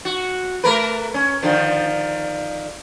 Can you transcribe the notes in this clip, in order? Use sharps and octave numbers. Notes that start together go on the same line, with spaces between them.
F#4
A3 A#4 B4
C#4
D3 D#3 F3